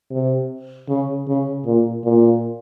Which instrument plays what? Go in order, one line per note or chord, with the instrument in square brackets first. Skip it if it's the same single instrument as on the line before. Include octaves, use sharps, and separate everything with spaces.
[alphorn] C3
C#3
C#3
A#2
A#2